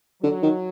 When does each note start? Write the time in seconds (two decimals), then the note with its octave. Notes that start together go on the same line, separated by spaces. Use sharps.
0.22 D3 F#3
0.42 D#3